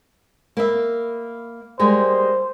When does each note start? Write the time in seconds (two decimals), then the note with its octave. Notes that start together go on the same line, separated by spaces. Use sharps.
0.57 A#3 B4 E5
1.79 G3 G#3 A#3 C5